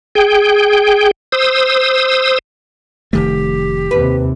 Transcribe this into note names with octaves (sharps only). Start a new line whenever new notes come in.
G#4 G5
C5 D#6 E6
F1 D#3 A3 G4
D#2 C3 B4